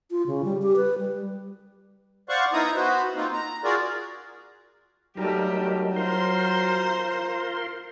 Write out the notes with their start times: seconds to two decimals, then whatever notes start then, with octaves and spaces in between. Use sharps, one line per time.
0.11 F4
0.27 C#3
0.44 G3
0.62 G4
0.76 B4
0.98 G3
2.29 C5 D5 F5 F#5 C#6
2.53 B3 D#4 E4 A#5 D#6
2.75 B3 F#4 B4 C5
3.16 A#3 C4 D#4 F4
3.33 A#5
3.64 F4 F#4 G#4 A#4 D5
5.17 F#3 G3 A3 D#4 G4 A#4
5.96 F4 A#4 C5 A#5 C6